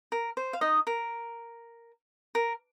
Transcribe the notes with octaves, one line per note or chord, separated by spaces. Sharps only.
A#4
C5
F5
D#4 D#5
A#4
A#4